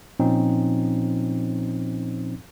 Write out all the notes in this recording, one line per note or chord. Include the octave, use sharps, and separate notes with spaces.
A#2 F3 C4 C#4 D#4